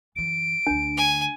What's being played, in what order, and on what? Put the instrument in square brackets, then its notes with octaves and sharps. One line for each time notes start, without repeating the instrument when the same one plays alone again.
[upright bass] F#2 E3 [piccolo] D7
[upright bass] D2 D3 [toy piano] D4
[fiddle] G#5